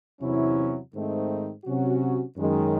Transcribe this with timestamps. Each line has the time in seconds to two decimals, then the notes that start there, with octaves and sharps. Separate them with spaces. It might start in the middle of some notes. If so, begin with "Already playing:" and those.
0.20 E2 C3 F#3 C#4 E4
0.93 G#2 D#3 A3 C4 D#4
1.65 C3 F#3 C#4 F#4
2.37 F#2 D#3 G#3